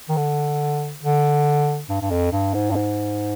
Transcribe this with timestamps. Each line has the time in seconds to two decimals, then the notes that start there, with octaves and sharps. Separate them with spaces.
0.09 D#3
0.17 D3
1.03 D3
1.89 G2
2.02 G2
2.11 F2
2.32 G2
2.54 G#2
2.71 G2
2.75 G#2